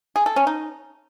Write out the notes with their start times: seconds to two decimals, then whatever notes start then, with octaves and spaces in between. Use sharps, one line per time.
0.16 G#4
0.26 A4
0.36 C#4
0.47 D#4